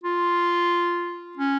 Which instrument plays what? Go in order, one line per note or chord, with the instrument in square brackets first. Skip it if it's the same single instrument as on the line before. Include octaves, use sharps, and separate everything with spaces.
[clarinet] F4
C#4